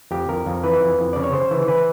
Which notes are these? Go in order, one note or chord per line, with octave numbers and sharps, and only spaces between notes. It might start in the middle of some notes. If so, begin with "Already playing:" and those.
F2 G4
F2 A#4
F2
E3 B4
F2
F2
C#3 D5
C#5
C#3 C5
E3
E3 B4